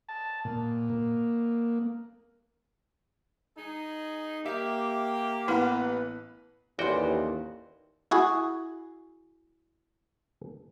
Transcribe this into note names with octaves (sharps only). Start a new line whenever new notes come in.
A5
A#2
A#3
D#4 G#4
A#3 G4 E5
A1 B3 E4 B4 F#5
A1 D#2 E3 F#4 D5 G5 C6
E4 F#4 G#4